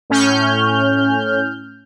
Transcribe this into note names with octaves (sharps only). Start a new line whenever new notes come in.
A2 C#4 F6 G6